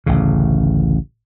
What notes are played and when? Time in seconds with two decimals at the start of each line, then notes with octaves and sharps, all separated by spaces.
0.06 A1 D2 C#3